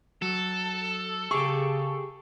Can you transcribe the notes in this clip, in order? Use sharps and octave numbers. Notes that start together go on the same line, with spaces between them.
F#3 A4
C#3 G4 G#4 C#6